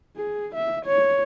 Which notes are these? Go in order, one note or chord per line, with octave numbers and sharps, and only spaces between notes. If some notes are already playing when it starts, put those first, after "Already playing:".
G#4
E5
C#5